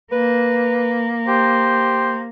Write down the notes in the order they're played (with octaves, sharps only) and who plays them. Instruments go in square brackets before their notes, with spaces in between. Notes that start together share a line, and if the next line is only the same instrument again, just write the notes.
[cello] A#3 [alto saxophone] B4
[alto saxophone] G4 [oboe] C5